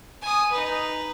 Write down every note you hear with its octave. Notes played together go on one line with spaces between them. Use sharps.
G#5 D#6
D#4 B4